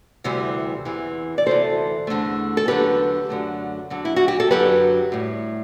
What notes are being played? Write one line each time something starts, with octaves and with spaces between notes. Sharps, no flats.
D2 C3 E3 G3
E2 C3 E3
D5
D2 C3 E3 A4 C5
E2 D3 A3
A4
E2 D3 F#3 A3 G4 B4
F#2 D3 F#3 A3
E2 D3 F#3
E4
F#4
G4
A4
F#2 D3 F#3 G4 B4
A2 G3